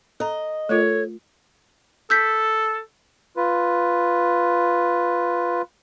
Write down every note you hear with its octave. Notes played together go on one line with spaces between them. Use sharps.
A4 D#5 A#5
A3 F4 A4 A#4 C#5
A4 E6 G6 B6
F4 B4